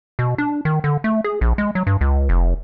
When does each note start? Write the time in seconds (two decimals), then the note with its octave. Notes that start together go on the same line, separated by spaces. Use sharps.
0.19 B2
0.38 D4
0.65 D#3
0.84 D3
1.04 A3
1.24 G#4
1.41 A#1
1.58 G#3
1.75 F#3
1.87 G2
2.01 C#2
2.29 F1